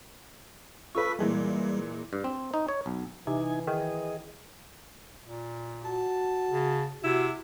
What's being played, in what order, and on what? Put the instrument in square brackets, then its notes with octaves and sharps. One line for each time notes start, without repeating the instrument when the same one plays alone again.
[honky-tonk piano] F4 A4 B4 [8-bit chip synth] C#6 E6 B6
[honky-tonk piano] A#2 E3 G#3 [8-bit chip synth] G3
[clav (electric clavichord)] G2
C4
D#4
C#5
B1
[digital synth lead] C3 [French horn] E3 [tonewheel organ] D#4 G#5
[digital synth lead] D#3 [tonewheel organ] G#4 D#5
[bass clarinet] A#2
[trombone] F#4 [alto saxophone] A5
[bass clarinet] C#3
[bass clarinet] C3 [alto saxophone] E4 [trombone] F#4